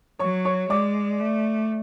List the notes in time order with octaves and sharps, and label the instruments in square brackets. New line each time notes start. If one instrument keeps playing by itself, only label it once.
[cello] F#3 [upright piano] C#5 C#6
[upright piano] C#5 C#6
[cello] G#3 [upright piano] D5 D6
[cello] A3